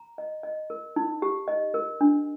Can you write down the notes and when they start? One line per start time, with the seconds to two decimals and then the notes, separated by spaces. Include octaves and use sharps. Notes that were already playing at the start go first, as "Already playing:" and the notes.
Already playing: A#5
0.18 D#5
0.43 D#5
0.70 A#4
0.96 D#4
1.22 G4
1.48 D#5
1.74 A#4
2.01 D4